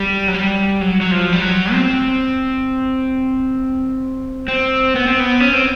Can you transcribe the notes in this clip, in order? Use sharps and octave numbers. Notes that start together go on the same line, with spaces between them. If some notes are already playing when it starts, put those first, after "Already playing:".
Already playing: G3
F#3
G3
F#3
F#3
F3
G3
F#3
C4
C4
B3
C4
B3
C#4
C4